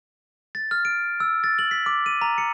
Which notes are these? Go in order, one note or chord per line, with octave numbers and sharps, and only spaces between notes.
A6
F6
D7
E6
A6
F#7
B6
D6
D#7
A#5
C#7